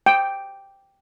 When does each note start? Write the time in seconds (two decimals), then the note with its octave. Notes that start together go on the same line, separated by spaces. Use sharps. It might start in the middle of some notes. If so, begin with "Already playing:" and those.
0.06 G5